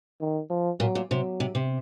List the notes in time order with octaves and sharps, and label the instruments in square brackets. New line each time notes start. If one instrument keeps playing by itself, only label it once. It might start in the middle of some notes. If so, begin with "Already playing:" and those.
[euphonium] D#3
F3
[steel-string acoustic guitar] A#2 [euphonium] F#3
[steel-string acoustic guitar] A#2
[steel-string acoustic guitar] C3 [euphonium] F#3
[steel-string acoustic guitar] C3
C3